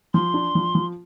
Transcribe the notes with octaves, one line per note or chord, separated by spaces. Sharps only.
F3 C6
D4
F3
F3